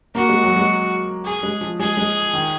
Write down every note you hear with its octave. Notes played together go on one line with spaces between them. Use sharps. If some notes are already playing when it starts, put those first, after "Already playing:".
A#3 F#4
G#3
F#3
G#3
G#4
G#3
F3
G#3 G#4
G#3
D#3